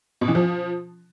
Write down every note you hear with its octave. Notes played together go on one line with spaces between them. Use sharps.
B2
E3
F3